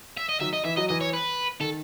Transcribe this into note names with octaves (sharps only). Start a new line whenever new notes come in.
E5
D#5
D#3 F#3 E5
D#5
E3 E5
F#3 D#5
E3 D#5
C#5
B4
D#3 A4